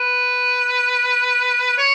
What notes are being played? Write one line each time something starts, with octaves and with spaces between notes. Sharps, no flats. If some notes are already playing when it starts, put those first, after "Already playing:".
Already playing: B4
C#5